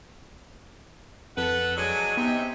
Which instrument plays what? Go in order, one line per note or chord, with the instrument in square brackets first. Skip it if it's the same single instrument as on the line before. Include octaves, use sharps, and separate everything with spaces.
[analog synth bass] F2 [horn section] A4 B4 F#5
[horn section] F#3 G#3 D4 [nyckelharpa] G#5
[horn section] C3 D#4 E5 [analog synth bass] B3